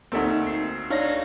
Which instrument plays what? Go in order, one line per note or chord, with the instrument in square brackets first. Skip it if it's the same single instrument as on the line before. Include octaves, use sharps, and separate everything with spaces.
[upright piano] D2 A3 C4 [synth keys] A#3 D#4
[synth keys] C7
[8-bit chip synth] D4 D#4 F5 [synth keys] C#5 A#6